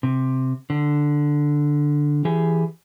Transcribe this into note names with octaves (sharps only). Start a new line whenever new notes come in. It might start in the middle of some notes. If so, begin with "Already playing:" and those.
C3
D3
E3 G4 G#4